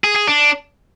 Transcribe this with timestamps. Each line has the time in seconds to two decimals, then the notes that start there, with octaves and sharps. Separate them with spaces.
0.04 G#4
0.16 G#4
0.28 D4